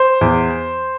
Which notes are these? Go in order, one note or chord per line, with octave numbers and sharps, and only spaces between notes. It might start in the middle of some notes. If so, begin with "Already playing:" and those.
Already playing: C5
E2